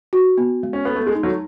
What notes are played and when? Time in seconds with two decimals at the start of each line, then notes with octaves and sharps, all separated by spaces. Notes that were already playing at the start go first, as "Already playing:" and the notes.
0.13 F#4
0.38 B3
0.63 G#3
0.73 C#4
0.85 B3 A4
0.95 A3
1.07 G#3
1.15 D#4
1.23 F#3 A3